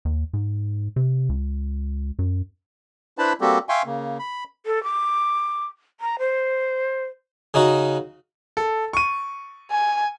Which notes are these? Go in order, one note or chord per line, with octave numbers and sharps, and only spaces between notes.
D#2
G#2
C3
C#2
F#2
D4 E4 B4 C5 A5 B5
G3 A#3 C4 F#4 G4 A4
E5 F5 G5 G#5 C6 C#6
C#3 A#3
B5
A4
D6
A#5
C5
C#3 D#4 F#4
A4
C#6 D#7
G#5